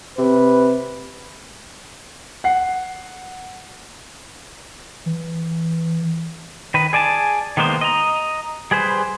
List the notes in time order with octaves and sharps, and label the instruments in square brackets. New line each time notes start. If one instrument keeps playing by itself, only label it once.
[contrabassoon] C3 [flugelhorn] B4
[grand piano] F#5 C7
[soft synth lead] E3
[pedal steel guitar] D#3 B4
G#4 D5 G#5 A5
D#3 G#3 A#3 B3 C5
D#5 A#5
G3 G#4 B4 C5